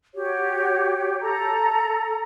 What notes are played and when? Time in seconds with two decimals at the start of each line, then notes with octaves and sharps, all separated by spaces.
0.15 F#4 G4 C#5
1.22 A4 A#5